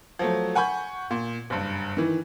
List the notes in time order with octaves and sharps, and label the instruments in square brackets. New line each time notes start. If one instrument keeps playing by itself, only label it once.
[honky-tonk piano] F3 F#3 A3
F#5 G#5 B5 C#6 G6
A#2
F#1 G2
D#3 E3